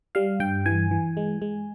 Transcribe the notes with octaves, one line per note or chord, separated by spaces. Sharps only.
G3 F5
G2 G5
E3 G#5
E3
G#3
G#3